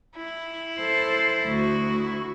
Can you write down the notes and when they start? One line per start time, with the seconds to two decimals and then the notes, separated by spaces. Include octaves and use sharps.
0.16 E4
0.80 A4 C5
1.45 D2 F#4